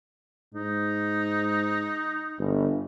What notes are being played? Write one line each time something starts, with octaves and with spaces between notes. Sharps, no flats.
G#2 D#4
G1